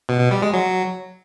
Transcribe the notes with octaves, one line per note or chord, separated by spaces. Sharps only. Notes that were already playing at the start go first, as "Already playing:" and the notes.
B2
B2
G3
G#3
F#3